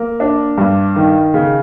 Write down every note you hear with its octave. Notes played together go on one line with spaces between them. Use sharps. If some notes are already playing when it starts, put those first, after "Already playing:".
Already playing: A#3
D4
G2
D#3
C#3